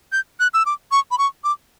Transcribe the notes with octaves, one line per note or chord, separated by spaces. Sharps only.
G6
F#6
E6
D6
C#6
B5
C#6
D6